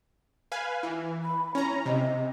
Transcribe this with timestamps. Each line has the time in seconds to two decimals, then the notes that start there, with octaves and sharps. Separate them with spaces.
0.52 B4 F5 G#5
0.83 E3
1.22 B5
1.55 C#4 E4 A#5
1.86 C3 D#5